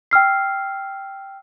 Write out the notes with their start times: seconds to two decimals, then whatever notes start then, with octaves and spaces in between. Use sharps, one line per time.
0.11 G5 E6 F6 C7